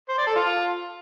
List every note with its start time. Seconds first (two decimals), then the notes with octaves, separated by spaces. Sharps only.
0.09 C5
0.18 D5
0.27 A4
0.36 F4